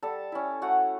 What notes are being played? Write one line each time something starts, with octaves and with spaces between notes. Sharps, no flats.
G3 A4 A5
C#4 E4
A3 F#4 F#5